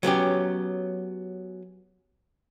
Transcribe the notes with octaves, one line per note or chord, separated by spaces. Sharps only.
F#3 B3 C#4 G4